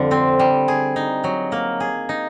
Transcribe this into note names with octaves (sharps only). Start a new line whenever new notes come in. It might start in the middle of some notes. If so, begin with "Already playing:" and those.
Already playing: F2 D3 G3
C4
G3
G#4
D#4
F#3
A#3
G#4
D#4